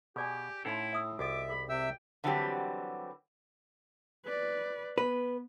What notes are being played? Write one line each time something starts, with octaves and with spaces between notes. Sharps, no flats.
B2 G4 G#4 D5 G#5
A2 C#4 D#4 E4 A4 F5 A#5 C6
E5 D#6 E6
C2 F#4 A4 D#5 E5 D6
G#4 B5
C3 E5 G5 E6
D3 E3 F#3 G3 C4 G4
B4 D5
B3 B4